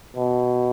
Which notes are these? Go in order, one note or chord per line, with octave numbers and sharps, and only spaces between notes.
B2